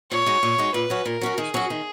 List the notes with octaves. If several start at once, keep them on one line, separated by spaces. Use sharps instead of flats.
A#2 C#5
G#3 D#4 F#4
A#2
G#3 D#4 F#4
A#2 B4
F#3 C#4 F#4
A#2 A#4
F#3 C#4 F#4
D#3 G#4
F#3 C#4 F#4
D#3